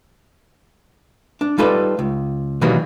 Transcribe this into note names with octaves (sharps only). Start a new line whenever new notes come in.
D4
G3 D#4 F4 A4 B4 D5
C#2
B2 D#3 E3 F#3 G3 A#3